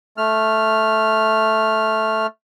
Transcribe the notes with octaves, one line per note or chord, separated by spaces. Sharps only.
A3 F6